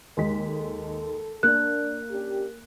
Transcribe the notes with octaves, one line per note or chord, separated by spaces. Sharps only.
D#2 G#3 B6
A4
A#3 D4 F#6
C#4 D4 G4